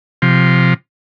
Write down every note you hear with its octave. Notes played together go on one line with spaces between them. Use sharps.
C3 F3